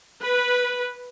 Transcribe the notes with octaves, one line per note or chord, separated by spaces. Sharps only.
B4